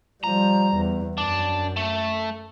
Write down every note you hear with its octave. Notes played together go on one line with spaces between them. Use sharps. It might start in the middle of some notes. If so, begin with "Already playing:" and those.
F3 G3 A#5
E2
F#2 D4
A3